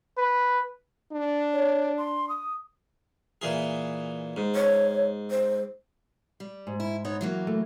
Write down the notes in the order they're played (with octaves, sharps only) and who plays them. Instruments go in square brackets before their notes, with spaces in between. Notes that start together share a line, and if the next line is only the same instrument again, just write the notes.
[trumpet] B4
[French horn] D4
[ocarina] C#5
C6
D#6
[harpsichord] A#2 E3 G#4
G#2
[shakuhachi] C#5
C5
[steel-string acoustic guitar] G3
[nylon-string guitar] G#2
[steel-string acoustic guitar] E4
B3 D#4 C#5
E3 F#3 A#3
[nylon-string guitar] A3